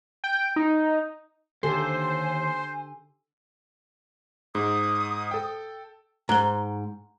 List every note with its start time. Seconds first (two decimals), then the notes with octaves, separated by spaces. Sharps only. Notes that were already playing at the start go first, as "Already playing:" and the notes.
0.24 G5
0.56 D#4
1.63 D#2 D3 G4 A4 C5 G#5
4.55 G#2 D#6
5.31 A4 G5
6.29 G#2 A#5 F#6 G7